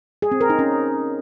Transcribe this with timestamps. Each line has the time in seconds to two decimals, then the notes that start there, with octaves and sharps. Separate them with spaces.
0.22 G#4
0.31 C4
0.41 A#4
0.50 D#4
0.59 C#4